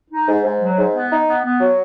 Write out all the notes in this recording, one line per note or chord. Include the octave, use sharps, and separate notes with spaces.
D#4
G#2
G#2
F#3
G#2
B3
D#4
B3
B3
F#3